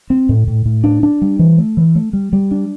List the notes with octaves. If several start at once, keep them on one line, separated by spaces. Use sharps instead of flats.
C4
A2
A2
A2
D4
D4
G3
E3
A3
E3
A3
G3
G3
D4